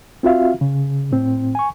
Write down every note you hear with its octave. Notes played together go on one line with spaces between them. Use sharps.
C4 F4 F#4 E5 F5
C#3
A2 C4
G#5 C#6